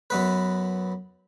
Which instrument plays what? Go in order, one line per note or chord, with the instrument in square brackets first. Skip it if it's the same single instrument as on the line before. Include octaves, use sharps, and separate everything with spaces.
[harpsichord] F#2 B3 B4